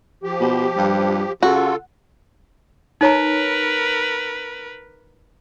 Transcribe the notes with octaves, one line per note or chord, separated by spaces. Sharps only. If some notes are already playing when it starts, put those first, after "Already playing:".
F3 G4
B2
G2
C#3 F4 F#4 A4
D#4 A#4 B4 C#5 A#5